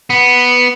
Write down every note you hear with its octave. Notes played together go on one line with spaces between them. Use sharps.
B3